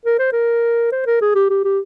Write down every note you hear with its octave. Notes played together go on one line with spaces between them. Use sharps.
A#4
C5
A#4
C5
A#4
G#4
G4
G4
G4